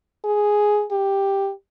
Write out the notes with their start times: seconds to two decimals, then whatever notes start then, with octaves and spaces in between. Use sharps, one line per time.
0.24 G#4
0.91 G4